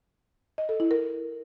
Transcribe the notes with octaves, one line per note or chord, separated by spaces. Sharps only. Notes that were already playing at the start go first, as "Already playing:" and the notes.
D#5
A4
E4
A#4